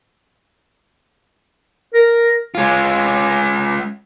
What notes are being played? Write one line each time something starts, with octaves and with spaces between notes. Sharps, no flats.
A#4
G#3 F4